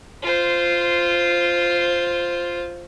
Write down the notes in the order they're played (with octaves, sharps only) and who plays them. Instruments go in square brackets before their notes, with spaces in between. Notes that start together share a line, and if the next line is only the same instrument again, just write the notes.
[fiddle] F4 C5